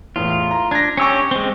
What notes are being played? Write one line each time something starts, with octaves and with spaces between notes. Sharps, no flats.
E2 A2 F4
A#5
D4 G#6 A#6
C#4 G4 C#6 E6 C#7
G#3 C4